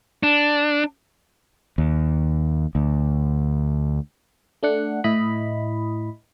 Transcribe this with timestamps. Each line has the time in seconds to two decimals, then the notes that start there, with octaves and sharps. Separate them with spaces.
0.23 D4
1.78 D#2
2.75 D2
4.63 A3 D4 F#5
5.04 A2 E4 D#5 B5